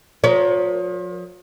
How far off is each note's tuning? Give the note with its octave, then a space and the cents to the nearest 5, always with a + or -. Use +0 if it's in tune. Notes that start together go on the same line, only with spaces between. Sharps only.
F3 +40 A#4 +0 C#5 +35